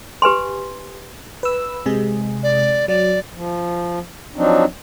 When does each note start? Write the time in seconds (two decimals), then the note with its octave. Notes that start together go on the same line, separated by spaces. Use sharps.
0.22 G4 B4 G#5 C6
1.43 B4 E6
1.86 C3 G#3 G#4
2.43 D5
2.88 F#3 D5
3.33 F3
4.36 F3 F#3 C4 D4 D#4